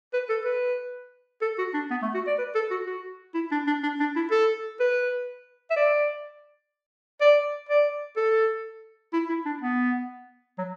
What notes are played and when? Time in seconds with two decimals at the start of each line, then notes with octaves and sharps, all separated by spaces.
0.14 B4
0.29 A4
0.45 B4
1.42 A4
1.59 F#4
1.74 D4
1.91 B3
2.02 A3
2.14 F#4
2.27 D5
2.38 B4
2.55 A4
2.71 F#4
2.86 F#4
3.34 E4
3.51 D4
3.67 D4
3.83 D4
4.00 D4
4.16 E4
4.31 A4
4.80 B4
5.70 E5
5.76 D5
7.21 D5
7.69 D5
8.17 A4
9.13 E4
9.29 E4
9.46 D4
9.62 B3
10.58 F#3